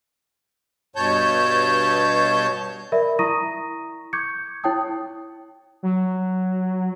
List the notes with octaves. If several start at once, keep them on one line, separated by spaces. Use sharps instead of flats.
G2 B2 C#5 A5 G6
A#4 D5 E5 B5
E4 A#5 C#6 D#6 A#6 D#7
C#6 D6 G6 G#6 C#7
E4 C#5 G5 A5 D#6
F#3